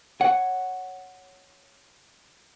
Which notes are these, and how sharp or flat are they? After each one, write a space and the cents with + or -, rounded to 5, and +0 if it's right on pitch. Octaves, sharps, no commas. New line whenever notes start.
C#5 +0 F#5 +0